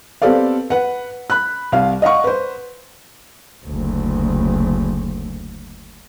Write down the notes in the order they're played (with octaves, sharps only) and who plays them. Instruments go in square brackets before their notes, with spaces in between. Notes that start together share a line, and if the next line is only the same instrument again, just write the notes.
[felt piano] B3 C4 G4 A4 D5 F5
B4 F#5
B5 F#6
C2 F5
D#5 F5 F#5 C#6
B4 C5
[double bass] F#1 D2